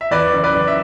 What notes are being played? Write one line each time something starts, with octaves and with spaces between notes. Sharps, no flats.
E5
E2 B4 D5
F#1
B4 D5
F#1
E5